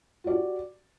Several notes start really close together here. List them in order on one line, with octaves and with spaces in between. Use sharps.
F#4 D5 G4